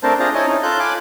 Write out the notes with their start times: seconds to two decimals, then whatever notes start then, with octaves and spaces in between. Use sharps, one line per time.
0.03 A3 C4 D4 A#4 C5 A5
0.20 D4 F4 G#4 C5 A5 A#5
0.34 E4 C#5 D#5 G#5 A5
0.47 C#4 D#4
0.63 F4 A4 F#6 G6
0.80 F5 G#5 B5 D6 F#6